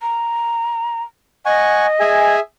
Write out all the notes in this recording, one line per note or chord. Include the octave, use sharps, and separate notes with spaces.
A#5
D#5 F#5 G#5 C#6
G#4 E5 G#5